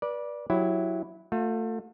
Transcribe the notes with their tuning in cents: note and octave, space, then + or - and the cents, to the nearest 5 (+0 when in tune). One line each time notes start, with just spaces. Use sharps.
B4 -35 D5 +0
F#3 -10 E4 +0 G4 +0
A3 +25 F4 +45